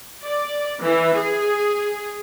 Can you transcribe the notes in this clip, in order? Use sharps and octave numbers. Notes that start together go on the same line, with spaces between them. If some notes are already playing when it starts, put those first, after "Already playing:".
D5
E3
G#4